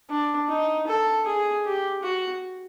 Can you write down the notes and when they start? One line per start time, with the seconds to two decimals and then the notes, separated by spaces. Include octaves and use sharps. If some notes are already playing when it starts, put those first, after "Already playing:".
0.10 D4
0.49 D#4
0.87 A4
1.26 G#4
1.65 G4
2.03 F#4